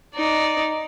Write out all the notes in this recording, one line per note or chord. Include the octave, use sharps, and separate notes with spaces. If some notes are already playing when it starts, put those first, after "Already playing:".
D#4 D5